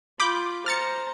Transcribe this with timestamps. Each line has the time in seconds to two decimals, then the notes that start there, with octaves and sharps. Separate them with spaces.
0.20 F4 B5 D6 G6
0.66 C5 A#5 F6 A6 C#7